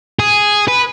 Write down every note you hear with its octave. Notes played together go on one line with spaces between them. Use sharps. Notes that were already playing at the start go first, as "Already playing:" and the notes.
G#4
B4